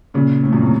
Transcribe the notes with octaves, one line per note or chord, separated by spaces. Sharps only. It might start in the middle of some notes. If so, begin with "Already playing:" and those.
A#2 C#3
A2
F#2 A#2
A2 C3